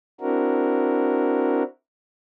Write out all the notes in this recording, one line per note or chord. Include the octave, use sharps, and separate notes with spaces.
C4 D4 E4 F#4 A#4